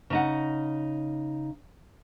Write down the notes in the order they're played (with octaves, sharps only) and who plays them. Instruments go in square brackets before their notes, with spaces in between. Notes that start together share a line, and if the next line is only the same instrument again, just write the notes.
[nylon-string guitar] C#3 D#4 F#5